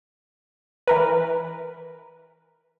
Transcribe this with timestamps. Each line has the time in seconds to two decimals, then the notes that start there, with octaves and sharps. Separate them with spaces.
0.87 E3 A#4 B4